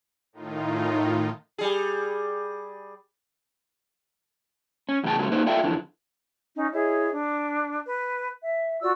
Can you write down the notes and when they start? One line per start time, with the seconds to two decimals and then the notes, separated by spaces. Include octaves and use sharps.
0.33 A2 D#3 D#4 F4
1.58 G3 G#4
4.89 C#4
5.04 E2 A2 C#3 F4 G5 A5
5.18 C#3 F#3 G#3 A3
5.32 A#3 D#4 B4 C5
5.47 F4 A4 D5 E5 F5 G5
5.64 F2 D3 E3
6.55 C#4 D#4
6.73 E4 G#4 C#5 D#5
7.12 D4
7.86 B4
8.42 E5
8.81 F4 F#4 D5 E6